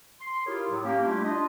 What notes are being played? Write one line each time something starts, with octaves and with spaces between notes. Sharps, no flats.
C6
E4 F4 G4 G#4 A#4 C#5
A2 F#3
A#3 C#4 G4
G3 A3 D4 E4 F4 G4
D4 F4 D#5